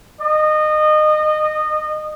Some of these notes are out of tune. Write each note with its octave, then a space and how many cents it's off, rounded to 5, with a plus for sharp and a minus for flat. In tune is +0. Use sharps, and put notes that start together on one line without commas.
D#5 -25